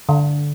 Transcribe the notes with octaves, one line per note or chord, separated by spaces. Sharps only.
D3